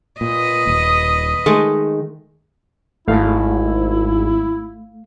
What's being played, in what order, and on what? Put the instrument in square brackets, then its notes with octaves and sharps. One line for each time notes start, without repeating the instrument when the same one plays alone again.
[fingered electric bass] A#2 [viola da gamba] B4 D#5
[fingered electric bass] D#1
[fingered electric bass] D#3 [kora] G#3 A3
[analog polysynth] G#1 [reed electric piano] A3 F5 [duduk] E4